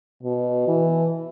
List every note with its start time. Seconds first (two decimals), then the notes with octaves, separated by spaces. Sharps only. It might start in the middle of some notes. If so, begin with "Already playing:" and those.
0.23 B2
0.68 E3